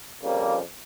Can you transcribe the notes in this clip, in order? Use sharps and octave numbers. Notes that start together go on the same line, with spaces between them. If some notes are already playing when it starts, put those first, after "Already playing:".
F2 C#3 F3 G3 A#3